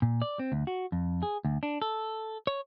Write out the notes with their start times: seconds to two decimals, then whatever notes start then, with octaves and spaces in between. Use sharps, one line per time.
0.02 A#2
0.22 D5
0.39 C4
0.52 D2
0.67 F#4
0.92 F2
1.23 G#4
1.45 D2
1.63 D4
1.82 A4
2.47 C#5